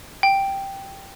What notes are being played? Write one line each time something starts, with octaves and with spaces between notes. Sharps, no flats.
G5